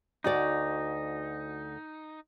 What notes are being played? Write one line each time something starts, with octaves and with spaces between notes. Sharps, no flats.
D2 D#4 F#4 D5